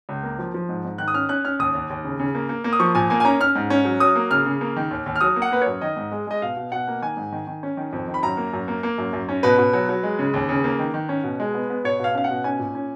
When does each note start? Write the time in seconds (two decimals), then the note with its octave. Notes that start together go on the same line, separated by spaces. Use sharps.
0.09 C#2
0.23 A#3
0.39 F3
0.54 F3
0.69 G#2
0.84 G#2
0.98 D#3 F#6
1.08 D#6
1.14 C#4 F6
1.29 C#4 F#6
1.45 C#4 F6
1.59 D#2 D#6
1.75 D#2
1.90 D#2
2.04 C#3
2.19 C#3
2.35 A#3
2.49 A#3
2.64 A#3
2.73 D#6
2.80 F3 C#6
2.95 A#2 G#5
3.10 A#3 G#5
3.20 G#5
3.25 C#4 A#5
3.40 C#4 F6
3.55 G#2
3.70 C#4
3.85 F#3
4.00 F#3 D#6
4.16 A#3
4.31 C#3 F6
4.46 C#3
4.61 A#3
4.76 D#3
4.91 D#2
5.06 D#2
5.16 F6
5.21 F#3 D#6
5.36 A#3
5.42 F#5
5.51 A#3 B4
5.62 F#2 C#5
5.81 D#3 D#5
5.96 G#2
6.12 G#3
6.27 G#3 D#5
6.42 B2 F5
6.57 B2
6.72 B2 F#5
6.87 A#3
7.02 D#3 G#5
7.17 G#2
7.32 D#3
7.47 D#3
7.63 C#4
7.77 D#3
7.93 F2
8.08 D#3
8.14 B5
8.23 F#2 A#5
8.37 A#3
8.53 F#2
8.68 A#3
8.83 A#3
8.98 F#2
9.13 F#2
9.29 C#4
9.43 B2 B4
9.58 B2
9.73 F#3
9.89 F#3
10.03 G#3
10.19 C#3
10.34 D#2
10.49 C#3
10.64 A#3
10.79 D#3
10.94 D#3
11.09 C#4
11.24 B2
11.40 G#3
11.54 B3
11.70 B3
11.84 B2 C#5
12.00 B2 F5
12.15 C#4 F5
12.24 F#5
12.30 B2
12.44 C#4 G#5
12.59 A#2
12.75 C#4